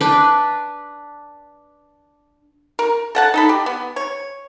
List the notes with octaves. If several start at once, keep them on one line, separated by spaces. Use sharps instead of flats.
D4 B4
A#4
A4 F#5 A5
D#4 A4 B5
G4
B3
C#5